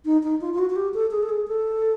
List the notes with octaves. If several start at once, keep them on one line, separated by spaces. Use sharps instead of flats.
D#4
D#4
F4
F4
F#4
F#4
G4
A4
G#4
A4
G#4
A4